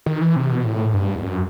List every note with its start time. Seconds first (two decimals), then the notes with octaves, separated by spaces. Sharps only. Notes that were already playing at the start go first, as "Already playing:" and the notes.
0.06 D#3
0.22 E3
0.36 C3
0.51 B2
0.65 A2
0.94 G2
1.15 E2
1.24 F#2